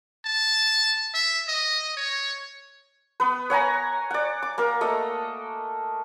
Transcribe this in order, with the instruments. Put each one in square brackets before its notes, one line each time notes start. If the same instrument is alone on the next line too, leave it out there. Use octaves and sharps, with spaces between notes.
[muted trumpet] A5
E5
D#5
C#5
[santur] B3 B4
C#5 F#5 G#5 A#5
D5 F#5
D6
A#3 A#4
A3 A#3 D#5